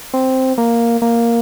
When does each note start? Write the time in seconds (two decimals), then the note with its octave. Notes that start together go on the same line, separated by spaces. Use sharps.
0.14 C4
0.58 A#3
1.02 A#3